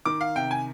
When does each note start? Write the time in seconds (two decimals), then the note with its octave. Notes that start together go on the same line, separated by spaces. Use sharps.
0.05 D#3 D6
0.21 F5
0.35 C3 G5
0.51 G#5